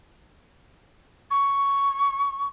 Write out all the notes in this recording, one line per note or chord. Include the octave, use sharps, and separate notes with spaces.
C#6